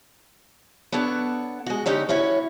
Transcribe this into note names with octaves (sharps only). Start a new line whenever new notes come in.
B3 D4 A4 C#5 F#5
G#3 F#4
D3 C#4 D#4 G4
C#4 E4 F#4 C#5